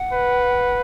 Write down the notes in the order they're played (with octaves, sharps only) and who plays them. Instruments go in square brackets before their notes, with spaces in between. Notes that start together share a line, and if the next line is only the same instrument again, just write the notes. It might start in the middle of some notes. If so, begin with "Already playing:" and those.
Already playing: [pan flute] F#5
[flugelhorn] B4